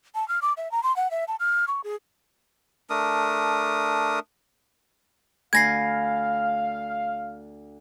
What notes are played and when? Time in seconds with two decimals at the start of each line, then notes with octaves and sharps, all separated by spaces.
0.15 A5
0.28 F6
0.42 D6
0.57 E5
0.72 A#5
0.83 C6
0.96 F#5
1.11 E5
1.28 A5
1.40 F6
1.68 C#6
1.84 G#4
2.90 A3 D4 A#4 D#6
5.53 D2 F5 G#5 B5 G#6 A#6 C7